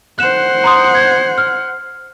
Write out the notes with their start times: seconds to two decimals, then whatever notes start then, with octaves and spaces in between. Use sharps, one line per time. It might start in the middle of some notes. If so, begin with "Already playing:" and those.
0.19 C5 F#5 F#6 E7
0.64 A#5 C6 D#6
0.95 G#6
1.38 F6